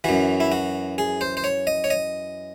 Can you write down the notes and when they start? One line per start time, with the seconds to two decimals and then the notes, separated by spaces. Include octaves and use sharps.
0.04 F#2 E3 F#4
0.40 E4
0.52 F#4
0.98 G#4
1.21 C5
1.37 C5
1.44 C#5
1.67 D#5
1.84 C#5
1.90 D#5